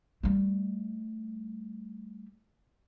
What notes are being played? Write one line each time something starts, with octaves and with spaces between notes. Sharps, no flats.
G3 A3